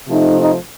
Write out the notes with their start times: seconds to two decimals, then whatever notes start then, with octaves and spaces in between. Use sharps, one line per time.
0.08 C3 F3 A3 D#4
0.39 D#4